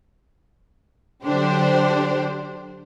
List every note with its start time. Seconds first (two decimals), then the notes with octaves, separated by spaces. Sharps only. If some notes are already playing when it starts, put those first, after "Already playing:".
1.24 D3 F#3 D4 G4 C5